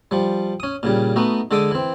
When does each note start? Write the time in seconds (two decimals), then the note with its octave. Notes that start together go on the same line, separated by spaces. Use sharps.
0.11 F3 G3
0.60 C#4 D#6
0.83 A#2 C#3 G3
1.16 A3 B3 D#4 F#4
1.51 D3 G#3 A4 D5 D6 D#6
1.71 E3 C4